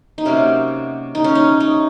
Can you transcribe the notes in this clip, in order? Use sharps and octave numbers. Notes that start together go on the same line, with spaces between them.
D#4
C3 F#3 A#3 C#4
D#4
C#4
D#4
D#4